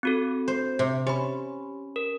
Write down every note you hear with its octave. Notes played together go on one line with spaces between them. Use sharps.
C4 F#4 A4
C5
C3
C#4 G4 B5
A#4